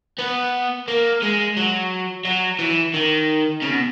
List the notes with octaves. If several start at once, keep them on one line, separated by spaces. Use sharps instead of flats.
B3
A#3
G#3
F#3
F#3
E3
D#3
C#3
B2